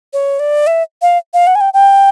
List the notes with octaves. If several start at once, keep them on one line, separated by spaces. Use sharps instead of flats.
C#5
D5
E5
F5
F5
F#5
G#5
G5
G5